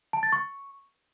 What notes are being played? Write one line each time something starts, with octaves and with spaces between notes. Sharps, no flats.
A5
A6
C#6